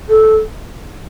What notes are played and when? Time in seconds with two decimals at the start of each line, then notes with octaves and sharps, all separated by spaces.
0.08 A4